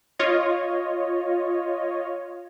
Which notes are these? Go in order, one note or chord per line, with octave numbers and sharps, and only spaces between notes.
F4 C#5 D#5